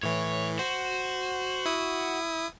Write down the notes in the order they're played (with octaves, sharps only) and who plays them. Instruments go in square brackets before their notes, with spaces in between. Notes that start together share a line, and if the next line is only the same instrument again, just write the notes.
[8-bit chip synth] A2 E3 [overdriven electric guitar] C#5
[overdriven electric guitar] F#4 [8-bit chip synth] C5
[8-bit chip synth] E4 D#6